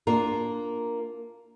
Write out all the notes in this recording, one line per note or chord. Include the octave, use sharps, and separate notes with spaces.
A#3 D4 F4 A#4